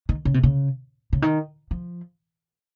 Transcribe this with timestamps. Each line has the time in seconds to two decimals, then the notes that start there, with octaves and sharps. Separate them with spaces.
0.09 D#3
0.25 C#3
0.34 C3
0.43 C#3
1.13 C#3
1.22 D#3
1.71 F3